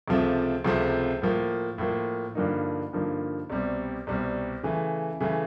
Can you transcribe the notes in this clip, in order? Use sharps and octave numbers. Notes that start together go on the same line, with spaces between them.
C#2 C3 F3 A3 C4
C#2 C3 F3 A3 C4
A2 F3 A#3
A2 F3 A#3
G2 D3 F3 A#3 D#4
G2 D3 F3 A#3 D#4
C2 B2 G3 C4
C2 B2 G3 C4
C#3 E3 A3
C#3 E3 A3